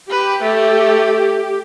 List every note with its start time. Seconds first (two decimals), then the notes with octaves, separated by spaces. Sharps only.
0.10 G4 B4
0.43 A3